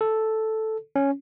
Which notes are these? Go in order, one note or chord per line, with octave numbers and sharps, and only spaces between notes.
A4
C#4